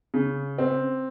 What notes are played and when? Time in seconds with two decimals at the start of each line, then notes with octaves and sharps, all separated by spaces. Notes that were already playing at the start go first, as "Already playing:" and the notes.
0.14 C#3
0.58 C4